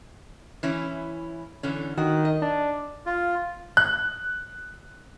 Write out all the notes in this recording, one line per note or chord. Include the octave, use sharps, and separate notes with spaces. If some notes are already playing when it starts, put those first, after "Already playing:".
E3 C#4 E4
D3 E3 C#4
D#3 F#4
D#5
D4
F4
F#6